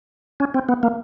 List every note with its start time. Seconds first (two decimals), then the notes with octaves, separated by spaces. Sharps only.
0.40 C#4
0.54 C4
0.69 B3
0.83 A#3